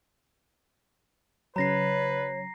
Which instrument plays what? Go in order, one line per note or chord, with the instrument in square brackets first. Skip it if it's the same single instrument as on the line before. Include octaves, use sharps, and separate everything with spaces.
[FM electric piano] C#3 F#3 [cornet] B4 [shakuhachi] C#5 [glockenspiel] A#5 A#6 C7